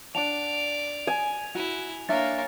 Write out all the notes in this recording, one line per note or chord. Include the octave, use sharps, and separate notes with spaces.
D4 D5 F#5 A5 F7
G#5
E4 F#4
A#3 D4 C#5 E5 A6